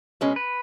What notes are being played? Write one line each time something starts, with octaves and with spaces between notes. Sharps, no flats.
B2 G#3 C#4
B4